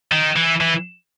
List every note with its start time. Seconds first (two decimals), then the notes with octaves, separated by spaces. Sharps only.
0.12 D#3
0.36 E3
0.61 E3